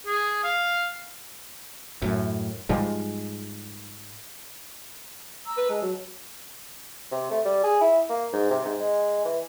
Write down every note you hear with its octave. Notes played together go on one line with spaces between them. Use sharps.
G#4
F5
F#2 A2
G#2 F3 G3 G#3
A#5 E6
B4
G#3 A5
F#3
C3
A3
G3
G#4
E4
A#3
G#2
C3
G#2
G#3
E3